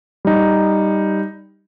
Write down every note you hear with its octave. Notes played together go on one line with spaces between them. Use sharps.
G3 D#4